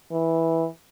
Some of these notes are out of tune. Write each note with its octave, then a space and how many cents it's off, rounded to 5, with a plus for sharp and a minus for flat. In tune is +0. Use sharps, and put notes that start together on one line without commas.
E3 -10